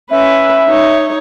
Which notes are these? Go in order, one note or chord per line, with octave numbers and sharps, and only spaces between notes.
C#4 B4 E5
D#4 C#5